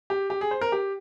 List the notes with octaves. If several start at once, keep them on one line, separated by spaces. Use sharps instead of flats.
G4
G4
G#4
C5
A#4
G4